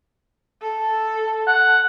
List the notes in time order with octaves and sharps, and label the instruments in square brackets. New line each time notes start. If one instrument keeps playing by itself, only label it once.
[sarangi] A4
[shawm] F#5